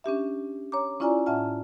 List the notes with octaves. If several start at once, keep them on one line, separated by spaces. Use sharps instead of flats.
C#4 D4 G4 E5
C#5 A#5 D6
C#4 E4 F4 D5 G#5 A#5
A2 C#4 E5 F#5 A5 F6